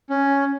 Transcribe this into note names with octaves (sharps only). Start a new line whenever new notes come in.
C#4